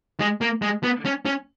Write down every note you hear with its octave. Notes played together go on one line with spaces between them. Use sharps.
G#3
A#3
G#3
B3
C#4
C#4